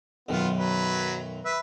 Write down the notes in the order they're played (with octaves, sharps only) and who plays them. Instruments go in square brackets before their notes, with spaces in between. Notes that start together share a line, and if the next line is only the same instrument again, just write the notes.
[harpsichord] B1 F#2 D#3 [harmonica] B3 F4
[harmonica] F#3 B4
B4 E5